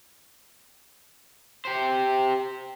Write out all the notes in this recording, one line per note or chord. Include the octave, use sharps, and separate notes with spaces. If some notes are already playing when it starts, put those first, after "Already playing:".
G4 C5